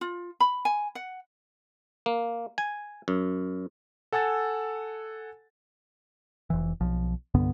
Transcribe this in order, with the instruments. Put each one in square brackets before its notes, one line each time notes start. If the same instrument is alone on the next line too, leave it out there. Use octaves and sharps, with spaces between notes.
[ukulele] F4
B5
G#5
F#5
[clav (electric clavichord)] A#3
G#5
F#2
[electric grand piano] A4 F#5 G#5 E6 A6
[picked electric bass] F1 E3
B1 F3
C2 G2 D3 B3